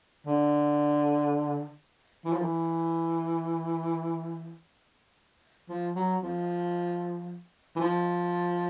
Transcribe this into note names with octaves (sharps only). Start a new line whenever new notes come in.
D3
E3
F3
E3
F3
F#3
F3
E3
F3